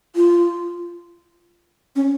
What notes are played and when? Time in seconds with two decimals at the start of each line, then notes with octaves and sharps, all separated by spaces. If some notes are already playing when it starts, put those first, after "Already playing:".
0.16 F4
1.96 C#4